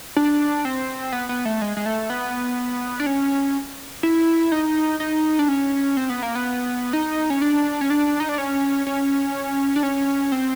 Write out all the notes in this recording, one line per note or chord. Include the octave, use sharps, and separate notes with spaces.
D4
C4
B3
B3
A3
G#3
G#3
A3
B3
D4
C#4
E4
D#4
D#4
D4
C#4
C4
B3
A#3
B3
D#4
C#4
D4
C#4
D4
D#4
D4
C#4
C#4
D4
C#4
C4